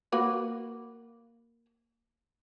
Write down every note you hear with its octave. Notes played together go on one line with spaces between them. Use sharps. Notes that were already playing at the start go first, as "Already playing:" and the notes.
A#3 F#4 B4